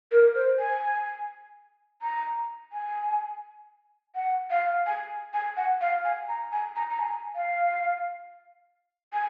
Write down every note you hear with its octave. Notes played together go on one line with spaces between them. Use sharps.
A#4
C5
G#5
A#5
G#5
F#5
F5
G#5
G#5
F#5
F5
G#5
A#5
G#5
A#5
A#5
G#5
F5
G#5